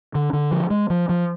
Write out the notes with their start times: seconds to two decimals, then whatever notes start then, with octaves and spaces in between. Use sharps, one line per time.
0.15 D3
0.33 D3
0.51 F3
0.70 G#3
0.90 F3
1.09 F3